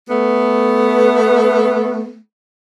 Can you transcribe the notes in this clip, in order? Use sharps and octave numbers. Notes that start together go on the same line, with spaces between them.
A3 B3